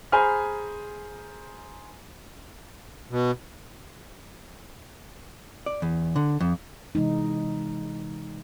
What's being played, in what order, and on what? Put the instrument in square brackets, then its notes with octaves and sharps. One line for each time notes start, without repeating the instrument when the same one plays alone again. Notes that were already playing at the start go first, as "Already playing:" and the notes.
[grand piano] G#4 C5 G#5 A#5 B5 F6
[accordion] B2
[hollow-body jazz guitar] D5
E2
D3
F2
[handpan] C3 E3 G#3 D#4